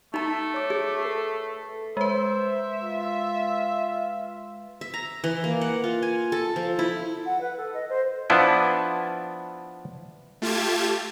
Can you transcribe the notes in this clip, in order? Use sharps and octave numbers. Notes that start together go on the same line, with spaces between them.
A3 D#4 A#5
C#5 D6
G#4
A4 B4 C7
G#3 B4 C5 E5
F4
E5
A#5
E3
A#3
F#5
F4
G#5
A4
F3
E4
F#5
B4
A4
D#5
C5
F3 B3 D4 E4
A3 F4 G4 A5 G#6